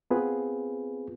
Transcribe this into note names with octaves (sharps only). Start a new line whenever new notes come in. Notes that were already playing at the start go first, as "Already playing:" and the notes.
B3 C4 F4 G#4 B4